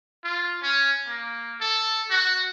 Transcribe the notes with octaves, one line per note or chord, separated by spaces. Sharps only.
F4
C#4
A#3
A4
F#4